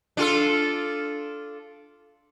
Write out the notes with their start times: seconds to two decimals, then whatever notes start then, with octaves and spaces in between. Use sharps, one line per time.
0.17 D4 F4 A4